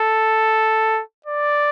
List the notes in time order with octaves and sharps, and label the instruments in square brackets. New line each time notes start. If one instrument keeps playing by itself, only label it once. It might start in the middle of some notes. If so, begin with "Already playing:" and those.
Already playing: [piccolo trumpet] A4
D5